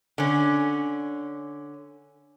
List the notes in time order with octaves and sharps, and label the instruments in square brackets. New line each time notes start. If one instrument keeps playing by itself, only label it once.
[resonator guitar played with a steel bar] D3 C#4